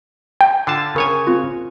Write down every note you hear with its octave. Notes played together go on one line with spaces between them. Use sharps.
G5
D3 F4 A5
C#3 A#4 C#5 G#5
C4 F4